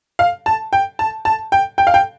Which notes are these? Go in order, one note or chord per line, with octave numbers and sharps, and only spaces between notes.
F5
A5
G5
A5
A5
G5
G5
F5
G5